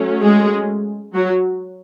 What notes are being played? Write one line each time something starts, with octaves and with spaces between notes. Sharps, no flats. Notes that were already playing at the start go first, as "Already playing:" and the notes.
Already playing: F#3 A3 C#4
G#3 G#4
F#3 F#4